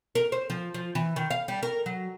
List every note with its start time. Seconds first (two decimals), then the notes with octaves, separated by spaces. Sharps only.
0.15 A#4
0.32 C5
0.50 F3
0.74 F3
0.95 E3
1.16 D#3
1.30 F5
1.48 G3
1.63 A#4
1.86 F#3